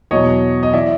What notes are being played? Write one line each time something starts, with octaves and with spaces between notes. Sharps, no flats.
E2 B2 F#3 C#5 D#5
D#5
E3 D5 E5